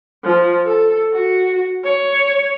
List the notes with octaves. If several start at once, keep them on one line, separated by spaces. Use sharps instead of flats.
F3
A4
F#4
C#5